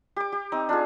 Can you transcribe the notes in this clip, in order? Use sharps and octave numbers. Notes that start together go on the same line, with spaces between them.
G4 D6
G4
C4 D#4
D4 F4 G#4